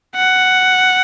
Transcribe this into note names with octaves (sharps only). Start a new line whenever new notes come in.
F#5